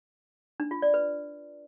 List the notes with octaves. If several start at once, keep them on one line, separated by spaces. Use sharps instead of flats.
D4
F4
D5
B4